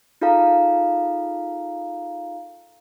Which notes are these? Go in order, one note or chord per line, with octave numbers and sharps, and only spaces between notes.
D#4 F4 G#4 A4 F5 A#5